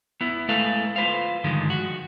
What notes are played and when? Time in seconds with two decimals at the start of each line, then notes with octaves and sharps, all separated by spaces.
0.21 B3 E4
0.49 G#3 A3 E4 A4 B4 F5
0.96 F4 B4 C5 F5
1.44 G2 D3 D#3 F3 G#3
1.70 F#4